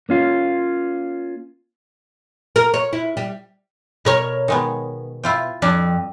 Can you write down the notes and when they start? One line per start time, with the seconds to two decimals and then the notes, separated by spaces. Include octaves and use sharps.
0.09 A#3 C#4 F4
2.56 A#4
2.74 C#5
2.93 E4
3.17 G3
4.05 B2 A#4 C#5
4.48 D#3 G#3 B3
5.23 E4 F4 G5
5.62 F2 D4